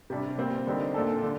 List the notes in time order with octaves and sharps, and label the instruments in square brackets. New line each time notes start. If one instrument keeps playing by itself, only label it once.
[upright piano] C3 G3 D4
A#2 G3 C4
D3 G3 C4 D#4 A#4
A#2 A3 D4 A4
D3